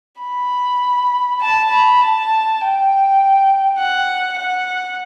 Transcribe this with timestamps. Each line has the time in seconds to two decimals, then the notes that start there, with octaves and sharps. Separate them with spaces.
0.22 B5
1.41 A5
1.71 B5
2.01 A5
2.61 G5
3.79 F#5
4.39 F#5